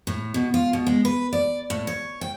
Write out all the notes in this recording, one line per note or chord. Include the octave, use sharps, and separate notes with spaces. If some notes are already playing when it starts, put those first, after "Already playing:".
A2
B2
F4
B2
G#3
B4
D5
A2
C#5
G5